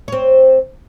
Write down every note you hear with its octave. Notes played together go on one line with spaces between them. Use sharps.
C4 C#5